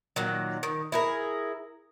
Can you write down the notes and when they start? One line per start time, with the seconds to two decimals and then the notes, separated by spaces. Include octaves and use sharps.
0.16 A#2 D#3 F#3
0.63 D#3
0.92 E4 G#4 A#4